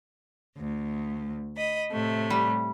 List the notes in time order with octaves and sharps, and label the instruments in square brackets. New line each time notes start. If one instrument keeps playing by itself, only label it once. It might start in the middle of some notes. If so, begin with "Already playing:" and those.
[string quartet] D2
D#5 B5
A2 C3 A3
[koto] G3